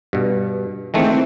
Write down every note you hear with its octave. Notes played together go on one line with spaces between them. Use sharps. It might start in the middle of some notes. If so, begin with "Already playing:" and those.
G2 B2
D#3 E3 G#3 A3 C4